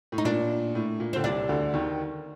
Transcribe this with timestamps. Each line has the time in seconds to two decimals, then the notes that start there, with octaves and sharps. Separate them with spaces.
0.12 A2
0.18 D#4
0.25 A#2 D4
0.75 A2
1.00 A#2
1.13 D3 C4
1.24 C2 C3 D4
1.49 D2 D3
1.74 D#2 D#3